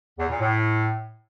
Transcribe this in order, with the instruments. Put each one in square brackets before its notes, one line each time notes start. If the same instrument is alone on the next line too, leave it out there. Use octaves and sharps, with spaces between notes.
[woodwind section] E2
A#2
A2